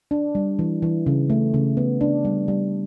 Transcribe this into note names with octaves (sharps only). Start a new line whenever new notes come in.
D4
G3
E3
E3
C#3
A3
C#3
B3
D4
G3
G3